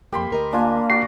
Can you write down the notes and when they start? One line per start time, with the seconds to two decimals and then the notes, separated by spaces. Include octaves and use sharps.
0.12 F2 G#2 A#3 G4 B5 C6
0.30 D2 A#4 D#5
0.53 A#3 D4 F4 G#5
0.90 F#4 D5 C7